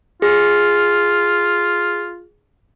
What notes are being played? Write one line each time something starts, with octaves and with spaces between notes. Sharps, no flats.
F4 G#4